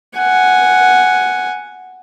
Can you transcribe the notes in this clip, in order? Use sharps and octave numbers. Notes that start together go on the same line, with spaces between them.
F#5 G#5